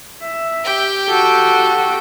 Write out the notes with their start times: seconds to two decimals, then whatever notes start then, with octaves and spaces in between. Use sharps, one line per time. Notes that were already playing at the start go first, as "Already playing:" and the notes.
0.22 E5
0.64 G4 G5
1.09 F#4 A4